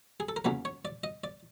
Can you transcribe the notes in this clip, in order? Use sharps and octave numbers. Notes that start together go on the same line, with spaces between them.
G#4
A4
A#4
E2 C#3 F#3 A#3 B4
C#5
D5
D#5
D5